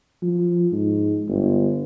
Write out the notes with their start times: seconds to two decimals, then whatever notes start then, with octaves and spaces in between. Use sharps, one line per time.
0.22 F3
0.72 G#2
1.29 G1